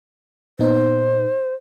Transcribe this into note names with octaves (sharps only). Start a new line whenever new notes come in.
A#2 B3 D#4 C5